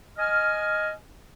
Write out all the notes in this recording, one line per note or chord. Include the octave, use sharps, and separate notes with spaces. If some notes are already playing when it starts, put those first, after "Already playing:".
D#5 G#5 F6